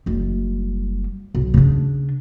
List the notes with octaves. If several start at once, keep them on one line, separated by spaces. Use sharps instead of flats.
F#1 G3
B1
C#3 D4